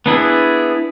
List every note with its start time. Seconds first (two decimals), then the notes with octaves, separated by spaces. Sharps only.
0.06 B3 D4 E4 G#4